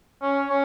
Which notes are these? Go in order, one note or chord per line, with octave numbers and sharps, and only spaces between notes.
C#4
C#4